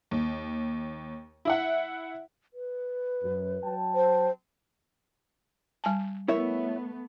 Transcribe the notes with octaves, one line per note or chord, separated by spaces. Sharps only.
D#2
E4 E5 F#5
B4
F#2
F#3 G5 A5
C5
G3 G#5 A5
A3 B3 E4 A#4 C#5 E5